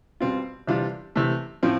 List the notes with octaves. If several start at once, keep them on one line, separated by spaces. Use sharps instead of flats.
B2 G3 C4 F4
C3 E3 G3 D4 F4
C3 E3 A3
A2 F3 C4